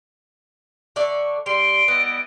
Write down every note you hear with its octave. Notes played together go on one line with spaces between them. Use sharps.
D3 D5 E5 C#6
G3 C6 D7
G3 B3 E4 D#5